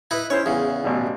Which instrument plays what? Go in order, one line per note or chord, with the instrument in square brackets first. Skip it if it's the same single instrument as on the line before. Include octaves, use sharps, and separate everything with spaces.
[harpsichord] D#4 E4 B4
[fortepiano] C#4 E4 C5 [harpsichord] C#5
[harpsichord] E2 C#3 [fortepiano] G#4
[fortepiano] A1 B2